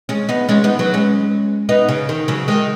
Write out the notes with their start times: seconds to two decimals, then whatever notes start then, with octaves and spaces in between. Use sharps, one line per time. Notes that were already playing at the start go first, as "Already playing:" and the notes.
0.09 G#3 C#4
0.29 B3 D#4
0.49 G#3 C#4
0.64 B3 D#4
0.79 F#3 B3
0.94 G#3 C#4
1.69 B3 D#4
1.89 C#3
2.09 D#3
2.28 C#3 F#3
2.48 D#3 G#3